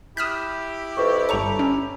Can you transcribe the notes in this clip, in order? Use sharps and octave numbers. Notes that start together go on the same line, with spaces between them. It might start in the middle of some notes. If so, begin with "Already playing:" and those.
E4 G4 D#6 F6 F#6 B6 E7
F2 B4 C#6
G1 A4 C#5 A#5 C#6 F7
C#4